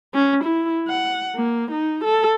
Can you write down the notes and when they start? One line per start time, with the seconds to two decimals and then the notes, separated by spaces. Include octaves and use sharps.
0.14 C#4
0.44 E4
0.88 F#5
1.35 A#3
1.71 D#4
2.04 A4